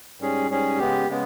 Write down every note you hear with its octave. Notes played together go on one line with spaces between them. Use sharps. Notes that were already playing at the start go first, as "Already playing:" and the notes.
G#2 G3 C#4 G#4
G#2 G3 C#4 G#4
C#3 G#3 B3 G4
C#3 G#3 B3